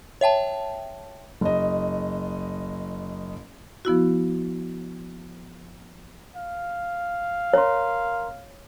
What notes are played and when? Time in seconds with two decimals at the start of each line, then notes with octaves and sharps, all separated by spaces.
0.21 C#5 E5 G5 A5
1.41 F#1 D#5
3.85 F3 B3 E4 F#4
6.37 F5
7.53 A#4 C#5 A#5 C6